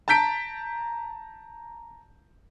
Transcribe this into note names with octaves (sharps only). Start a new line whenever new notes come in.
A5 A#5 G6 B6 D7